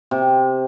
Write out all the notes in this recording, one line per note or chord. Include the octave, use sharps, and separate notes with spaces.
C3